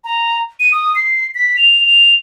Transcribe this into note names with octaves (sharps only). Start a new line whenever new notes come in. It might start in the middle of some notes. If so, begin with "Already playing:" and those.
A#5
D#7
D#6
C7
B6
F7
F7